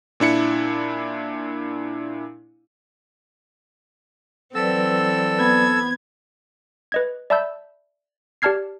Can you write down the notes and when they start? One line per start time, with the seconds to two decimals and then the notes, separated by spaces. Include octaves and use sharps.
0.20 A#2 D4 E4 C#7
4.55 E3 F#3 C4 A4 B4 D5 E6
5.38 B3 G#6
6.92 B4 D#5 G#6
7.30 D5 E5 A5 B5 E6 G6
8.42 G4 D5 A5 F6 G#6 C7